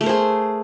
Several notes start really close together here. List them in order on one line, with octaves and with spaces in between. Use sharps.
A3 A#4 C5 G#4